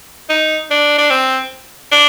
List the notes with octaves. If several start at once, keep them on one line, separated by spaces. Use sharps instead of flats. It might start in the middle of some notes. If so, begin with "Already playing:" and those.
D#4
D4
D4
C4
D4